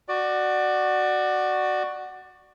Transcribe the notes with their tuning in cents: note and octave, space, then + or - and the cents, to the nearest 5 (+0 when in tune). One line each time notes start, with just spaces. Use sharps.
F#4 +5 D5 +20